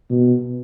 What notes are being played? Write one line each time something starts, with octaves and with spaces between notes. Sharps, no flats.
B2